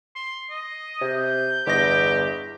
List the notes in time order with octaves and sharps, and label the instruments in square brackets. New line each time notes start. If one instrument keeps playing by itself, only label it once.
[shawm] C6
D#5
[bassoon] C3 [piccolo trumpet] G6
[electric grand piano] G1 D#5 A#6 [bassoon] E2 [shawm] G4